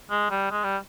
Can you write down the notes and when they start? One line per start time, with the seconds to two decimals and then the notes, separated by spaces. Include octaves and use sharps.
0.10 G#3
0.30 G3
0.51 G#3
0.64 G3